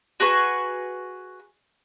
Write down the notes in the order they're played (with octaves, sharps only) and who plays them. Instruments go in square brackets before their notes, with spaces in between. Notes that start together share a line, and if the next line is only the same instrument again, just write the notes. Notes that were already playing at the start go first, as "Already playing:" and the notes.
[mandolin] F#4 G#4 B4 C#6